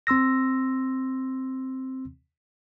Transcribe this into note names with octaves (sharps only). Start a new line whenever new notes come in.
C4 C6 E6 A#6